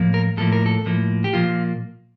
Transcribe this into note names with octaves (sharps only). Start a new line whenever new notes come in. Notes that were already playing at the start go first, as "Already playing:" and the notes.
Already playing: A2 F3 A#3
A#4
A2 F3 A#3 A4
A#4
A4
A2 F3 A#3
G4
A#2 F3 A#3 F4